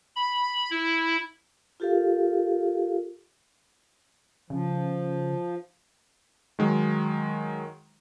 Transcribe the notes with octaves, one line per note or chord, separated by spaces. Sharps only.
B5
E4
F4 G4 A4 A#4 F5
C#3 F3
D#3 F#3 G#3